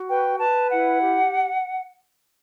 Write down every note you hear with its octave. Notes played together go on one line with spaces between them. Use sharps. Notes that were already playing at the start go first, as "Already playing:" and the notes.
Already playing: F#4
B4 G5
B4 A5
E4 F#5
G4